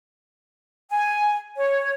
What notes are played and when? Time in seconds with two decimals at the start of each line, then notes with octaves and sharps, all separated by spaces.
0.90 G#5
1.56 C#5